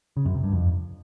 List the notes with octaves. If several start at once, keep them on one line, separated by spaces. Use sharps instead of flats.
C#3
F#2
C3
G2
F2